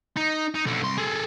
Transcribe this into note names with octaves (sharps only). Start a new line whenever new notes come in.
D#4
D#4
B1 D3
C2 C6
G#4 A4